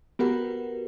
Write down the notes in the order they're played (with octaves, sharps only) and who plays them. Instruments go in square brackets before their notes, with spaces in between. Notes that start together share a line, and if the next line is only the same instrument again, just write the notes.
[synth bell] B3 F#4 G4 A#4 B4 F#5